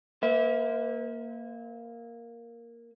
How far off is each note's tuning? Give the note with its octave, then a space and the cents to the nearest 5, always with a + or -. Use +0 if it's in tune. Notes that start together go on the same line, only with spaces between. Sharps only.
A#3 +0 B4 +45 E5 -30